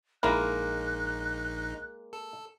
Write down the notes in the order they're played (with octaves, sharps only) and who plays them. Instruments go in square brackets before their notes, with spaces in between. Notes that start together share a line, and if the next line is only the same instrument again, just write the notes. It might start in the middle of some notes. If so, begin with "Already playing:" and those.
[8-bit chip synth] A#1 D#4 [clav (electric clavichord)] G#3 A#3 A#4 [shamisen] E4 B5 [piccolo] F#6
[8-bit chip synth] A4